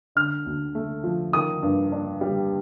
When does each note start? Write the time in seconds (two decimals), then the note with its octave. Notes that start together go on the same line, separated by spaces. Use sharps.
0.15 D3 F6
0.46 D2
0.75 A3
1.03 F3
1.33 D#3 D#6
1.62 G2
1.92 D4
2.21 G3